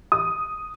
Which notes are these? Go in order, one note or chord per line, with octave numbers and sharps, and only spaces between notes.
D#6